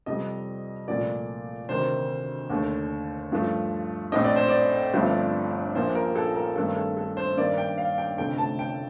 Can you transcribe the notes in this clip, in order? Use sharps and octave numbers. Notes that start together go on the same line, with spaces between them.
F2 C3 G3 C4 D#5
C2 A#2 F3 A3 D5
D2 C3 D#3 C5
D#2 D3 A3
G2 F3 A3
A#1 A2 A3 C4 D#5
D5
C5
D5
G1 G2 F3 A3 C4
A#1 A#2 F3 A#3 C5
A#4
A4
A#4
G2 D#3 A3 C4 A4
A4
A4
C5
G2 D#3 A#3 D5
G5
F5
G5
F1 F2 D3 A3 C4 G5
A5
G5